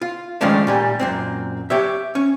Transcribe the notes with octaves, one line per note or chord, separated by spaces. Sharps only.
F4
D#3 F3 G#3 A3 C#4 D4
A#2 G3 G#5
F#2 A#2 C4
G4 C#5 E5
C#4